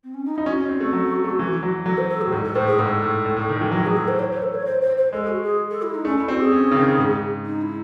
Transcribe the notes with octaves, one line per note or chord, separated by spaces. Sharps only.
C4
C#4
D#4
D#4 E4
C#4 F#4
C4
A3
F#3
A3
E3
F#3
F#3 A4
C5
A4
F#4
A2
G#2 A4
A4
A2 C5
G#4
G#2 A4
A2
A2
A2
D#3
E3
F#3 F#4
E3
F#3 G#4
A4
C5
C#5
C5
A4
C#5
C5
C5
C5
G#3 A4
F#4
G#4
A4
E4
D#4
A3 C#4
E4
C4 F#4
G#4
C#4
C#3
D#3
G#2
D#4
E4